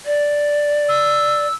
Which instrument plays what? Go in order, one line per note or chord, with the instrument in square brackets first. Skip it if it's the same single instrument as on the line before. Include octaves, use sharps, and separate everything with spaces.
[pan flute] D5
[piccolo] E6